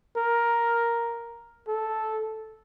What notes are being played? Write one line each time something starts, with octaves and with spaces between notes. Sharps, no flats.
A#4
A4